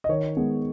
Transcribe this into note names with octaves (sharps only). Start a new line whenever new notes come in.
D#5
D#3 C#5
G#3 B3